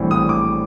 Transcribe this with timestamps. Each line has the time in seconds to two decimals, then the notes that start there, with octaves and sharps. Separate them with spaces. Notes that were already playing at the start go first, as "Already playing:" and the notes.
Already playing: A#1 A2 E3 G3 C4
0.11 D#6
0.29 D6